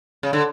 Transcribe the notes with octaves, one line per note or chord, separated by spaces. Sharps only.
C#3
D3